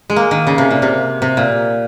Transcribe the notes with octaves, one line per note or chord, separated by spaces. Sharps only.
G#3
A#3
D#3
C#3
C3
A#2
C3
C3
A#2